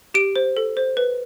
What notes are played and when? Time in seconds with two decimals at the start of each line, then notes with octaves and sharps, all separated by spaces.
0.14 G4 D7
0.36 C5
0.57 A4
0.77 C5
0.97 B4